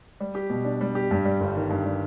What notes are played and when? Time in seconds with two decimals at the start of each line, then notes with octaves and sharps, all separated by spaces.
0.20 G3
0.35 G4
0.50 B2
0.65 D4
0.81 G3
0.95 G4
1.11 G2
1.25 G3
1.40 G1
1.56 D#3
1.70 G2
1.86 G3